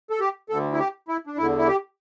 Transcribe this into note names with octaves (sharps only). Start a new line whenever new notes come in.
A4
G4
D2 D3 A4
E4
G4
E4
D4
E2 D3 E4
E4
G4